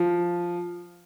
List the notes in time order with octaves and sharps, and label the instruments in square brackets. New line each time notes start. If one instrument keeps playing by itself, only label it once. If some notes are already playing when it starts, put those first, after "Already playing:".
Already playing: [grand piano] F3